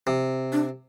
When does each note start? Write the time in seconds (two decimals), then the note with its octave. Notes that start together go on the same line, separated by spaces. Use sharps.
0.07 C3
0.52 D4